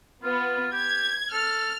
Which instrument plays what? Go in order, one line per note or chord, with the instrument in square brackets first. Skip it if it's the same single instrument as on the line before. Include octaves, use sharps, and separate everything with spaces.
[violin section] B3 [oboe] F4
[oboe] G4 [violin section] G#6
[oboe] A4 [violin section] F6